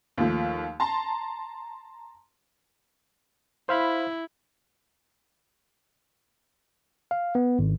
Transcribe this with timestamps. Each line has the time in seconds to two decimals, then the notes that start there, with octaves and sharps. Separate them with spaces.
0.18 D#2 F3 A3
0.80 A5 A#5 C6
3.69 E4 C5 F5 B5
7.11 F5
7.35 B3
7.59 G#1